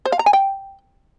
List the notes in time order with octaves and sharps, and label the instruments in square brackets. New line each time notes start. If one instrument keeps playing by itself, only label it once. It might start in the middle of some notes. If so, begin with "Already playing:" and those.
[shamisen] C5
F5
A#5
G#5
G5